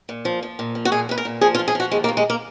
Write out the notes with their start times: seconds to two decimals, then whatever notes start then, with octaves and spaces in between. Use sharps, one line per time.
0.09 A#2
0.25 F3
0.43 F3
0.59 A#2
0.75 F3
0.85 F#4
0.92 A#2 G#4
1.09 A#2 B4
1.18 A#4
1.25 A#2
1.41 F3 G#4
1.55 F4
1.59 F3
1.68 G#4
1.75 F3 F#4
1.91 D#2 G#3
2.04 A#3
2.09 D#2
2.17 G#3
2.30 A#3